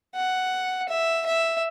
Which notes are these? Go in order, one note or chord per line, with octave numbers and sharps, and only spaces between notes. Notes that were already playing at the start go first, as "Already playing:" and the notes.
F#5
E5
E5